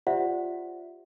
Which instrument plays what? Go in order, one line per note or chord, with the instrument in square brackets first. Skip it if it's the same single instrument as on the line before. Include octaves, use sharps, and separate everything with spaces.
[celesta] F4 G4 C5 D5 E5 F#5